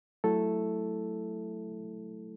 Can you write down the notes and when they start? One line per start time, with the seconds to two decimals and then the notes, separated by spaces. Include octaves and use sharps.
0.24 F#3 A3 E4 A4